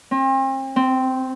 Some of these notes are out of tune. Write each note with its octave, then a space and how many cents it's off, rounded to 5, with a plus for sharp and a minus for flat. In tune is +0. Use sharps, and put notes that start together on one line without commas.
C4 +40
C4 -10